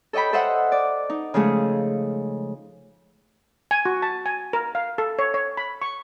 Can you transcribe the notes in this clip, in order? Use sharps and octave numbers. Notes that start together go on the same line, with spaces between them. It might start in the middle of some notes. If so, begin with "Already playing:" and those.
A4 C#5 D#5 G5 B5
A4 C5 D#5 E5 F#5
D5
D#4
C#3 F3 G#3 A3 G#4
G#5
F#4
A5
G#5
A#4
F5
A4
C#5
C#5
B5
C#6